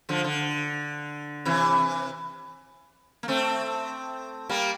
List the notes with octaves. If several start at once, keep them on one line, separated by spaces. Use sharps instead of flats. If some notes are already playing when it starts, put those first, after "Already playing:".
D3 F3
D3
C3 E3
A#3
A3 C4
G3 A#3